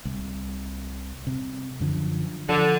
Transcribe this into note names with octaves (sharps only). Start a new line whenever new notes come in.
C2
C3
F#2 D3 F3
D3 F3